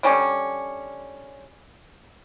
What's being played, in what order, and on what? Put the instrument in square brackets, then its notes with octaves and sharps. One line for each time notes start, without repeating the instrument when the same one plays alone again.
[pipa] D3 G3 C#4